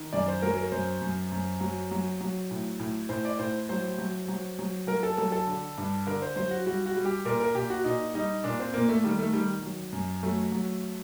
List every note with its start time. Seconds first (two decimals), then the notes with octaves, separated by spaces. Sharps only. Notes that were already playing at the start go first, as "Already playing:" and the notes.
Already playing: D#3
0.13 F#2 D5
0.28 C5
0.42 F#3 A#4
0.58 A#4
0.72 F#2 C5
1.02 F#2
1.32 F#2
1.60 F#3
1.91 F#3
2.21 F#3
2.51 A2
2.80 A2
3.09 A2 C5
3.25 D5
3.39 A2 C5
3.69 F#3 C5
3.98 F#3
4.28 F#3
4.59 F#3
4.87 F#3 A#4
5.03 A4
5.17 F#3 A4
5.32 A4
5.47 D3
5.78 G2
6.07 D3 A#4
6.22 C5
6.36 F#3 C5
6.51 F#4
6.66 G3 F#4
6.86 F#4
6.96 G3
7.05 G4
7.25 A#2 A#4
7.40 A#4
7.55 A#2 G4
7.70 F#4
7.84 A#2 D#4
8.14 G3 D#4
8.44 A#2 D4
8.60 C4
8.74 A#2 A#3
8.89 A3
9.04 D#3 G3
9.18 A3
9.33 D#3 G3
9.63 F#3
9.92 F#2
10.23 F#3 A3
10.52 F#3